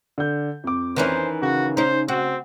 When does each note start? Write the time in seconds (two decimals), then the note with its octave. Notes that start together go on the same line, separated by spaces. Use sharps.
0.18 D3 G6
0.64 F2 D6
0.96 D#3 E3 C#4 C5
1.42 C#3 F#4
1.77 C#4 D#4 C5
2.08 C4 F#4